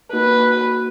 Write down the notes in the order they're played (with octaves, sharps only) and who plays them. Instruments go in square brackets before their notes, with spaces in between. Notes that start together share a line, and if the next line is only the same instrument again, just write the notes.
[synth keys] A#3 D#4 F#4 [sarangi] B4